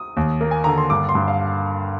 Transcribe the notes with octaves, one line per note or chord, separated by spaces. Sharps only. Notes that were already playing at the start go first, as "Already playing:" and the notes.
Already playing: D#6
D#2
A#3
G#5
D3 A#5
C6
G2 D6
C6
G2
F5